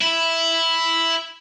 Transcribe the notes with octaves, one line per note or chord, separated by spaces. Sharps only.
E4